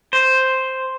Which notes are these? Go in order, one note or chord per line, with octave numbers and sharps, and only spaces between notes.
C5